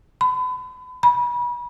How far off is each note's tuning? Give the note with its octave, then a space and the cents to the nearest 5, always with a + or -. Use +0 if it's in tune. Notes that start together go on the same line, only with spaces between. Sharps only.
B5 +35
B5 -35